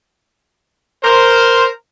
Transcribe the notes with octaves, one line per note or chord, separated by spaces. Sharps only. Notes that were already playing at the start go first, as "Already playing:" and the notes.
A#4 C5